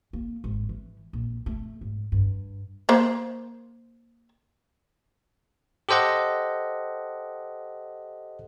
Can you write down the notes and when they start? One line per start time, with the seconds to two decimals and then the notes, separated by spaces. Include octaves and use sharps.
0.13 A#3
0.44 G#1
0.69 E3
1.13 A#1
1.46 A3
1.81 G#2
2.12 G2
2.89 A#3 C5
5.89 G4 A4 C5 D#5 F#5